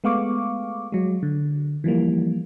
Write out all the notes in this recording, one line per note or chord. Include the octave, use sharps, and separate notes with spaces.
G#3 A3 B3 F5 C#6 D6
F#3 G#3
D3
E3 F3 G3 A#3